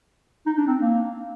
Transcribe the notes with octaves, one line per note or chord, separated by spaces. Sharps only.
D#4
D4
C4
A#3